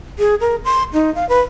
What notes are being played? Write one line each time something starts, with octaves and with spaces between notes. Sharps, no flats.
G#4
A#4
C6
D#4
F5
B4